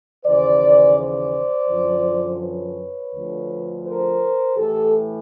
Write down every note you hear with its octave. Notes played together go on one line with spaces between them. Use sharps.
D#2 C#3 E3 C5 D5
C5 D5
F#2 D3 F3
B4 C#5
D2 D3 F3
A#4 C5
A2 E3 G4 A4